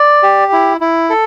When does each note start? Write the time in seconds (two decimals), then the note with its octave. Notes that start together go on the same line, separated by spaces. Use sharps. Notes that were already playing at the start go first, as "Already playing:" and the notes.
Already playing: D5
0.23 G4
0.52 E4
0.81 E4
1.10 A4